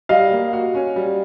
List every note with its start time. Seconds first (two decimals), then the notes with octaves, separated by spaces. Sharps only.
0.09 G3 D#5 F5
0.32 A#3
0.53 F#4
0.75 C#4
0.96 G3